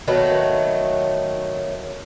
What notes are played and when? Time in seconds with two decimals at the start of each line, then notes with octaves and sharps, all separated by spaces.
0.08 D#3 F#3 A3 B3